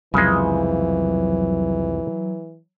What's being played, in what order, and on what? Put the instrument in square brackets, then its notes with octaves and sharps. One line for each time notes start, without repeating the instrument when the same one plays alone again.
[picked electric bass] C2 F2 [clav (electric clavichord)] C#3 G#3 [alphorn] E3 [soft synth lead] F#3